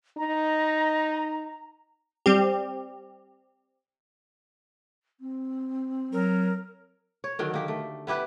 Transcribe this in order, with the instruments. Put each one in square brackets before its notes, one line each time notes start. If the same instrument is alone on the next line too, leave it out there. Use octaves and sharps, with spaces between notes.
[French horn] D#4 [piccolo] A#5
[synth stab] G3 C4 G4
[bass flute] C4
[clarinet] F#3 [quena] A#4
[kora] C#5
D3 D#3 F#3
A#3 G4
A3
B3 E4 G4 B4